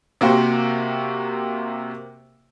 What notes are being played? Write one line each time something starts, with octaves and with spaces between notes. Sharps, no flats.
C3 A#3 F#4 G4 C5